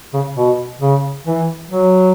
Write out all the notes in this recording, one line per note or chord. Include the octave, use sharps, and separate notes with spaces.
C#3
B2
C#3
E3
F#3